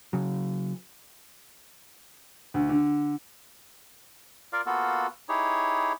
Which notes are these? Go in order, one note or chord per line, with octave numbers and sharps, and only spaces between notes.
C#3 F#3
D2
D3
F4 A#4 D5 F5
A#3 B3 F4 F#4 A4
D#4 E4 G4 G#4 C#5